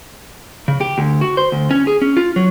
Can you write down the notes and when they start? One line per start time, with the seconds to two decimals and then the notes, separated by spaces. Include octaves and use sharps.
0.68 C#3
0.81 G4
0.98 D2
1.21 F#4
1.37 C5
1.52 D2
1.71 C#4
1.87 G#4
2.02 C#4
2.17 F4
2.36 F#3